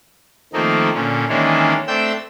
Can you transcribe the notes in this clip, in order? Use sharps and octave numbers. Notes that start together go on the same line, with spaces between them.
D#3 F3 A3 A#3 C4 D#4
A#2 D3 C#4
D#3 E3 G#3 A#3 C#4 D4
A3 C4 D4 G5 E6 G6